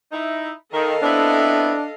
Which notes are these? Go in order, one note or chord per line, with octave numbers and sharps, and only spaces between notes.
D#4 E4
D#3 A4 A#4 D#5 F5
B3 C4 D4 E4